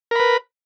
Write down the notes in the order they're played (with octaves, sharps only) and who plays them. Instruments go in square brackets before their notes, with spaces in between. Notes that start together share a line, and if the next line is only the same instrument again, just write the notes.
[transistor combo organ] A#4
B5
B4